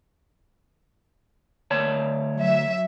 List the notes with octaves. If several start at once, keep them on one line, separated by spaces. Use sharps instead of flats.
D2 C#5 A5
F#3 E5